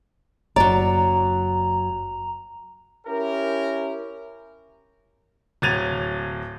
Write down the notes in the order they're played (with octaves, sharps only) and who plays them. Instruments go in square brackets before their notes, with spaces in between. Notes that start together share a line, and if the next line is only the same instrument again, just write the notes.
[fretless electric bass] F#1 [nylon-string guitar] F#3 D5 [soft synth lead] A#5
[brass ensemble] C#4 E4 G4 A#4
[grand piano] D1 F#3 G#6 A6 D#7 F7